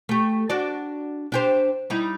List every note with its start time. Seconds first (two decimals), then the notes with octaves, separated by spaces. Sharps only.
0.09 A3 G4
0.50 D4 F#4 D5
1.32 D4 G4 C5
1.90 G3 D#4 E4